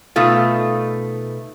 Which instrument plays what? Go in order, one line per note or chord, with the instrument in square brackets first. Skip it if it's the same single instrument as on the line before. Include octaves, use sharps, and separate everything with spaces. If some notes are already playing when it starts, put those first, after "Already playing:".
[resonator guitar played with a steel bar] B2 A3 D#4 F4